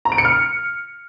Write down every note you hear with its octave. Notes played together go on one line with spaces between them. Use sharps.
A#5
D7
C#7
F6